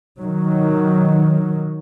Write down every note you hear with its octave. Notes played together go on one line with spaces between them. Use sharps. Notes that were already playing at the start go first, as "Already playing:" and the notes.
D#3 F#3